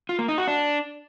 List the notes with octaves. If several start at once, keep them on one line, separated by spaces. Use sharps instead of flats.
F4
A#3
D#4
F#4
D4